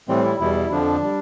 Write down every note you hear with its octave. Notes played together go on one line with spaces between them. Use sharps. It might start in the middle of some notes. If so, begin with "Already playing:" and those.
A2 E3 G3 C4
E4
E2 B2 G3 E4
F2 D3 F3 D4
G3